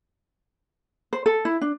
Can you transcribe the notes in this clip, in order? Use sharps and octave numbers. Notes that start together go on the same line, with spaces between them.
C5
A4
E4
D4